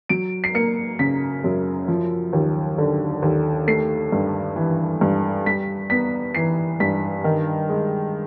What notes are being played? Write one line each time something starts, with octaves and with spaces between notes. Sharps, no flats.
F#3 D7
C7
A#3 C#7
C#3 B6
F#2
F3
D#2
D3
D#2
A3 C7
G2
E3
G2
G3 B6
B3 B6
E3 C7
G2 B6
D#3
G#3